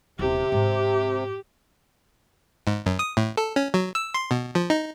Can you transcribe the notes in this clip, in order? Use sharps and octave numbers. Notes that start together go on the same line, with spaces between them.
D#1 C3 E4 G4
G#2
G#2
F#2
D#6
A2
A4
C#4
F#3
E6
C6
B2
F3
D#4